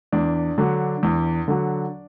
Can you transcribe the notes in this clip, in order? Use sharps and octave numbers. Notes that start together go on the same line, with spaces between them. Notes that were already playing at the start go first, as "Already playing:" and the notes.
E2 D4
D3 F#3
E2
D3 F#3